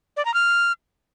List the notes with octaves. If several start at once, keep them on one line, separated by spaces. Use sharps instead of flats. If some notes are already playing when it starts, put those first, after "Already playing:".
D5
A#5
F6